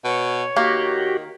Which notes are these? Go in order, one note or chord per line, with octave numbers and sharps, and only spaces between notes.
B2 C#5
D#3 A#3 F#4 G4